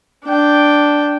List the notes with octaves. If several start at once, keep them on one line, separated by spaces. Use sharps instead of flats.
D4 G5